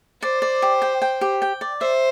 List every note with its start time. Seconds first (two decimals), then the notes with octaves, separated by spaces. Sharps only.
0.22 C5 D5
0.42 D5
0.62 G4
0.82 G5
1.02 G5
1.21 G4
1.42 G5
1.61 D5
1.80 C5 E5